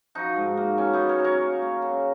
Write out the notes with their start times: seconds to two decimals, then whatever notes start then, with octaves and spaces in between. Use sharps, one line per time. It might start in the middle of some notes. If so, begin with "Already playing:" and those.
0.15 F3 D#4 F#4
0.36 G#2
0.57 A#3
0.77 F#3 C#4
0.93 B3 D#4
0.99 F#3
1.09 A#4 C#5
1.19 F#3
1.24 A#4 C#5
1.41 A#3
1.62 A#3
1.82 C#3